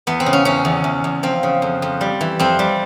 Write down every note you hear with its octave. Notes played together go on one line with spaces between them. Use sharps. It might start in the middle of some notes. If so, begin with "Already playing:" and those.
E2 B3
C4
C#3
C#4
E2 C#4
E2
E2
E2
F3 C4
C#3
F2
F2
G3
E3
F2 C4
G3